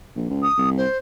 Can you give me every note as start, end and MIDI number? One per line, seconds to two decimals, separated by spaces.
0.16 0.27 34
0.30 0.47 37
0.43 0.70 87
0.58 0.85 36
0.77 0.98 72